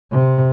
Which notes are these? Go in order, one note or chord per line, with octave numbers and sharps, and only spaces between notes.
C3